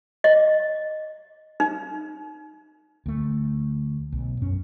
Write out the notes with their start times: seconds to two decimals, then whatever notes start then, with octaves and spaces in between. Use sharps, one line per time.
0.24 D#5
1.60 D#4
3.06 D2 A3
4.12 B1
4.42 F#2 C#4